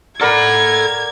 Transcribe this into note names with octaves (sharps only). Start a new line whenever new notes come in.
A4 A#4 D5 F#5 B5 G#6